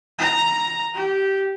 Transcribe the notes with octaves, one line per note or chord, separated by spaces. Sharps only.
A#5
G4